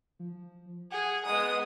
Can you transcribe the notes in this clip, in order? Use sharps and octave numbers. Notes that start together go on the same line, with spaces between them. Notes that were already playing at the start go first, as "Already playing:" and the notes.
F3
G#4 F#5
G#3 B3 D#6